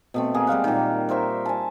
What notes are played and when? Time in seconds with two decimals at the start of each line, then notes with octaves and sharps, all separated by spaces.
0.14 B2 A3 C4
0.34 A#3 G#4
0.47 G3 G#3 F5 F#5
0.64 A#2 D#3
1.09 A#4 C5 E5 C#6
1.45 G#5 A5